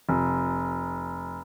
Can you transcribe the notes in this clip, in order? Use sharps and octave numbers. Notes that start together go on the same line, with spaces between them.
F1